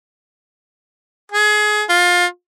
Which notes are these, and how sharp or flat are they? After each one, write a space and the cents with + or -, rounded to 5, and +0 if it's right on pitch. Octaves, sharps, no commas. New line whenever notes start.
G#4 +25
F4 +20